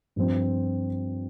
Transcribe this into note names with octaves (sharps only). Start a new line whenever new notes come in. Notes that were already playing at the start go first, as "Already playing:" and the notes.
G2 F3 C4